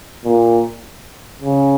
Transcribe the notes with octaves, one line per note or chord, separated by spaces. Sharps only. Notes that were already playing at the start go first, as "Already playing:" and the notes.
A#2
C#3